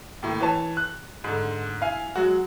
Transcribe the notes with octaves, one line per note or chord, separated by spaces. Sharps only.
D#2 A2
E3 C#5 A5
F#6
G#2 D3
E4 F5 G#5
F#3 G#3 F#4